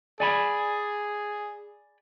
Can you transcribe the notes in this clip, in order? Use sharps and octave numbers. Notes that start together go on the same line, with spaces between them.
G#4 D5 G#5 B5